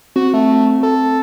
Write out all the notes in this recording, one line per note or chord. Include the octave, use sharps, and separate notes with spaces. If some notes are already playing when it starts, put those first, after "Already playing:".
C4 F#4
A3
A4